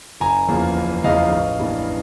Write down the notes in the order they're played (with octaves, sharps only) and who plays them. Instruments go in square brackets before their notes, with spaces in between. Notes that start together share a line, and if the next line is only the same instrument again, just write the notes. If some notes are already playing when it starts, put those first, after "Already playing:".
[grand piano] F#1 G#5 A#5
E2 C#3 F3 A#3
F#1
E2 C#3 F3 A#3 D#5 F5
A1
G2 E3 G3 A#3